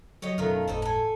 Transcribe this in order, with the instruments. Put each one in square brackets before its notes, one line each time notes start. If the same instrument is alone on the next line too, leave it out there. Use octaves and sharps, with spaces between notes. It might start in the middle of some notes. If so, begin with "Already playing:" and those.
[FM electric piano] F#3 [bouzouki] G4 C#5 D#5
[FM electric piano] F#2 B2 C#4 [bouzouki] D#3 A3 F4
[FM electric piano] G1 E2 A2 [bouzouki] C4 D#4 A4
[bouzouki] A4 G#5